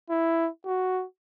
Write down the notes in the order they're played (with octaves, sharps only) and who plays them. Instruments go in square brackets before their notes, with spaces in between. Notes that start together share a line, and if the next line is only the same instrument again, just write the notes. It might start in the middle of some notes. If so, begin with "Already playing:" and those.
[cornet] E4
F#4